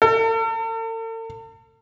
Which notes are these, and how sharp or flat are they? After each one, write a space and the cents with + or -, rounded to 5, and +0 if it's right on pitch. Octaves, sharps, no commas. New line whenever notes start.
A4 +45